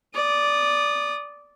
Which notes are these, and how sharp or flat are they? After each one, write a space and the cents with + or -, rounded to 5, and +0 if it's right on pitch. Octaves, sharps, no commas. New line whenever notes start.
D5 -10 D#6 -30